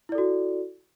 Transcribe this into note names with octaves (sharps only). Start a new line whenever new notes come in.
E4 F#4 A4 D5